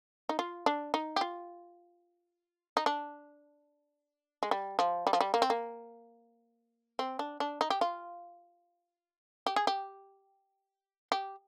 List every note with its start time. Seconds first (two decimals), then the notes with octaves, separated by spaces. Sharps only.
0.29 D#4
0.39 F4
0.66 D4
0.94 D#4
1.16 G4
1.21 F4
2.77 D#4
2.86 D4
4.43 G#3
4.51 G3
4.79 F3
5.07 G3
5.13 F3
5.21 G3
5.34 A#3
5.42 C4
5.50 A#3
6.99 C4
7.19 D4
7.40 D4
7.61 D#4
7.70 G4
7.81 F4
9.46 G4
9.56 G#4
9.67 G4
11.12 G4